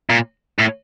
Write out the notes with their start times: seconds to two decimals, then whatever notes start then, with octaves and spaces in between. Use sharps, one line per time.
0.10 A#2
0.60 A2